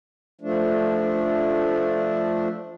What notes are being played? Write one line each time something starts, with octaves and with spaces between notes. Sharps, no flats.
F3 A3 D4